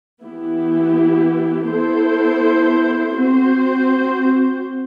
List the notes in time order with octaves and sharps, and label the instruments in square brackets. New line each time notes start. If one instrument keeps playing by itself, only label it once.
[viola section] E3 B3 E4 G4
B3 E4 A4 C5
C4 F#4 C5